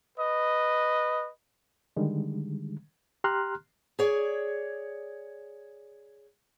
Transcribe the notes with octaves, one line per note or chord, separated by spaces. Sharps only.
B4 D#5
D3 D#3 G3 G#3
G4 A#5 C6 F6 F#6
G#4 C#5 D5